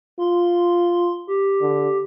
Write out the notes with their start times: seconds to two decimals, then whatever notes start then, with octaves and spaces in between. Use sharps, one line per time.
0.19 F4 C6
1.27 G4
1.61 D3